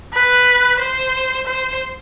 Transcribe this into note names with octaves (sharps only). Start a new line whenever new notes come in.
B4
C5
C5